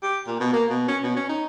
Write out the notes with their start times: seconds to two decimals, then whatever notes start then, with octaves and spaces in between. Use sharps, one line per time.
0.03 G4
0.27 A#2
0.40 B2
0.53 A#3
0.69 B2
0.88 C#4
1.03 B2
1.16 C#4
1.29 D#4